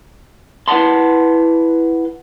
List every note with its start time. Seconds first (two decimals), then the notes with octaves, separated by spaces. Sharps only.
0.68 E4 B4 F#5 G#5 A5 C6